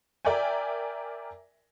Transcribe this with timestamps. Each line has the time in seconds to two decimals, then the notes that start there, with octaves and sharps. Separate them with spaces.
0.25 A#4 D5 E5 G5 G#5